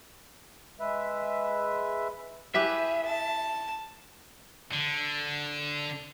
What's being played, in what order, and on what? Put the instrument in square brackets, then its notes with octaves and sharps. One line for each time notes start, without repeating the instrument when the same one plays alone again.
[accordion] G#3 B4 E5
[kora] E4 G4 B4 [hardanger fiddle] G#4 [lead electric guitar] E5
[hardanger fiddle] A5
[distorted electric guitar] D3